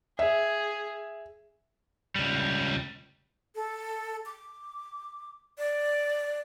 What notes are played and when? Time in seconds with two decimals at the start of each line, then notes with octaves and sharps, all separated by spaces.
0.19 G#4 E5
2.16 C#2 G3
3.55 A4
4.26 D6
5.58 D5